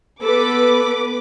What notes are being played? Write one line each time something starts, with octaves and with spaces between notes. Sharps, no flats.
B3 A4 B4 D6